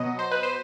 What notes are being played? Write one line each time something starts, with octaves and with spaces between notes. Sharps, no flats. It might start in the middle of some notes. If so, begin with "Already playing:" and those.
Already playing: B2 F#3 B3 D#5
C5
B4
C5